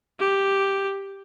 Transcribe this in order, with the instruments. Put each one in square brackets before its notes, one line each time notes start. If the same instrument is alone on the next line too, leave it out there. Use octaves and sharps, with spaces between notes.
[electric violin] G4